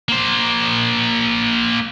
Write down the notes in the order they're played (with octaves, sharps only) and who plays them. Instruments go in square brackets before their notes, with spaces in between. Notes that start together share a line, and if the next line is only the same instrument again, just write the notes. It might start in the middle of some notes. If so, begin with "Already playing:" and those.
[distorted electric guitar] A#3 C5